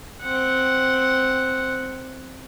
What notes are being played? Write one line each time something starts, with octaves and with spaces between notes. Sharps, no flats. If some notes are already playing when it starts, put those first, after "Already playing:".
C4 F#5